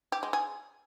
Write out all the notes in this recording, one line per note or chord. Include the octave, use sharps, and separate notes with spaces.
G4
G#3
G#4